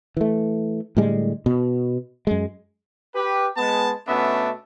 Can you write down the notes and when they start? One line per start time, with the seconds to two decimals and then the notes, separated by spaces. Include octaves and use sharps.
0.17 E3 A3
0.97 A2 D3 G3 G#3
1.46 B2
2.27 F#2 G#3
3.15 G4 B4
3.57 G#3 B3 A5
4.08 B2 A3 B3 C#4 D4 E5